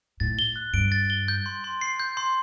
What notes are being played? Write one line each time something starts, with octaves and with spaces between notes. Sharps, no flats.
A2 A6
G7
F#6
G2 D7
A6
G7
G6
C6
C6
C7
G6
C6